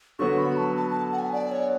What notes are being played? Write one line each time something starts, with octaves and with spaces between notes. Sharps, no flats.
D3 F#3 B3 F#4 C#6
B5
A5
A5
A5
F#5
G#5
D5
C#5